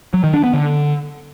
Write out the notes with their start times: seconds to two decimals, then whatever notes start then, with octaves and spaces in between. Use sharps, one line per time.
0.14 F#3
0.24 D#3
0.34 D4
0.44 B3
0.54 D3